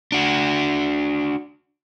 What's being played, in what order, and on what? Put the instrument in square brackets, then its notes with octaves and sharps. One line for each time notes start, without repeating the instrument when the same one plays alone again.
[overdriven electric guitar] D4 F#4